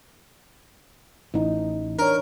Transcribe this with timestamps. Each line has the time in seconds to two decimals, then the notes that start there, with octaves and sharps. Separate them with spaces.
1.34 A1 E3 D#4
1.99 D4 A#4 C#5